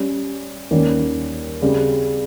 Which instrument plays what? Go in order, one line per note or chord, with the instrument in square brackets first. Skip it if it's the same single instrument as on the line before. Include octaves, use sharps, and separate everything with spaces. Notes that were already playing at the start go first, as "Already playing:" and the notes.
Already playing: [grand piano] G3 C#4 G4
D#2 D#3 G3 A#3 C#4
C#3 G3 C4 G4